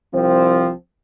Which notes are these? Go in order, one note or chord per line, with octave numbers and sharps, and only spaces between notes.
C2 F3 C4